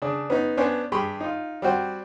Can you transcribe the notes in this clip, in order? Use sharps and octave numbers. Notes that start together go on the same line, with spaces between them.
C#3 D4
B3 C#4 D#4
B3 C#4 D4 C5 C#5 G#5
G2 G4 G#4 B5 C#6
D#4 F4
G3 C4 F#4 C5